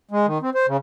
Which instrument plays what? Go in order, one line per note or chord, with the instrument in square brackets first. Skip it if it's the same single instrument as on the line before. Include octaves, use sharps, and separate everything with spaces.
[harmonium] G#3
D#3
C4
C5
C#3